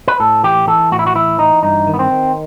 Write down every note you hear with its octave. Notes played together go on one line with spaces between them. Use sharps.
B4
A2 A4
E3 G4
E3 A4
A2 F#4
E4
F#4
E3 E4
E3 D#4
G2 D#4
D#3
B3
C4
D#3